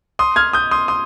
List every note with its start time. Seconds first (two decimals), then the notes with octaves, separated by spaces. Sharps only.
0.19 C6 D#6
0.36 F6 G#6
0.53 D#6 G6
0.71 C6 D#6
0.88 C6 D#6